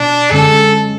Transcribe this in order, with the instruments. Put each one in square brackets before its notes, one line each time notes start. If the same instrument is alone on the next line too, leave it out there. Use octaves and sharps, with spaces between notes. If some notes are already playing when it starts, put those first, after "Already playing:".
Already playing: [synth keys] B2 [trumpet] D4
[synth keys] F#2 D3 G#3 C#4 [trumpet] A4